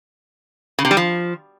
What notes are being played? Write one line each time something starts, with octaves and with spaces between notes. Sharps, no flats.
C#3
C3
G3
F3